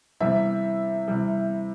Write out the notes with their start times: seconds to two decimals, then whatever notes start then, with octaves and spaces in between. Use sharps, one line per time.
0.21 C3 E3 G3 E5
1.08 C3 E3 G3